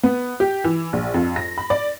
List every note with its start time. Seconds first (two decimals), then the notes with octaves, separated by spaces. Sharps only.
0.03 B3
0.40 G4
0.64 E3
0.93 A#1
1.14 F2
1.36 A#6
1.58 B5
1.70 D5